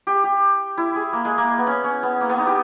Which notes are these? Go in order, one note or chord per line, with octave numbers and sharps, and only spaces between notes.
G4
G4
E4
G#4
A#3
G#3
A#3
B3
C#4
C#4
B3
A#3
B3
D#4
G4